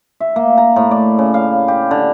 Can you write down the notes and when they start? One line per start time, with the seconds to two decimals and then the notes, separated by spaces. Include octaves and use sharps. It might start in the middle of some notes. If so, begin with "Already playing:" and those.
0.20 E5
0.36 A#3
0.58 A#5
0.76 A2
0.91 D5
1.19 C#3
1.34 F5
1.68 G4
1.91 D3